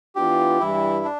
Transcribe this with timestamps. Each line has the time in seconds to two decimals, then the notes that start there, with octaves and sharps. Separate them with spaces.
0.15 E3 B3 D4 F4 G4
0.60 G2 E3 G3 E4
1.05 D4